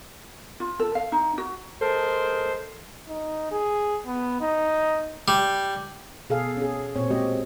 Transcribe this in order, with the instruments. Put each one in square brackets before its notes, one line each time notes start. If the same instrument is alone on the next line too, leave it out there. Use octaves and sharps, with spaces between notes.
[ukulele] F4
A4
F5
D#4
F#4
[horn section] G#3 A#4 C5 [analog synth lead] A4
[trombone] D#4
G#4
B3
D#4
[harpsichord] G3
[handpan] B2 G#4 A4 F5
C#4 G#4
A#2 C4 C#5
G#3 C4 F#4 G4 D#5